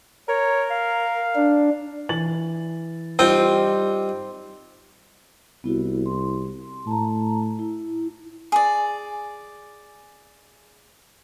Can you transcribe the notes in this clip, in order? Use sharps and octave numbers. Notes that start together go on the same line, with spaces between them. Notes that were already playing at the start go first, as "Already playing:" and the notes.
A#4 C#5
F5
D4
E3 A6 F#7
G3 C4 D#4 F4 C5
C2 B3 E4 F#4
C6
A2 A5 A#5
E4
G#4 D5